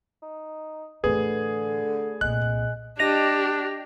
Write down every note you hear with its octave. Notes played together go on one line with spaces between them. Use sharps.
D#4
A2 D3 E3 A3 G#4 B4
C2 A#2 G#3 F#6
D4 G4 D#5 A#6 F7